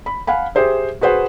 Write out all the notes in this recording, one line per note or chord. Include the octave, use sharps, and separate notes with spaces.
B5
F5 F#5 G#5 B5
G4 G#4 C5 E5
F#4 G#4 B4 C5 F#5